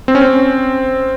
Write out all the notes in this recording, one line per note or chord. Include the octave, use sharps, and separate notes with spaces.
C4
C#4
C4